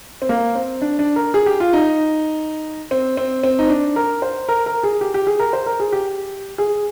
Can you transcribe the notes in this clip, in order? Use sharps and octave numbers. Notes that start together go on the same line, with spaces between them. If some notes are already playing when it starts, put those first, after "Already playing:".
C4
A#3
C4
D4
D4
A#4
G#4
G4
F4
D#4
C4
C4
C4
D#4
D4
A#4
C5
A#4
A#4
G#4
G4
G4
G#4
A#4
C5
A#4
G#4
G4
G#4